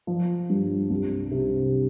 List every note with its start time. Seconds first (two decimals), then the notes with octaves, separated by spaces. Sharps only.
0.07 F3
0.49 G2
0.90 C2
1.31 C3